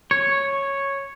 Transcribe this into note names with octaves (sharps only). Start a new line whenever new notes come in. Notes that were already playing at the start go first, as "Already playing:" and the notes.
C#5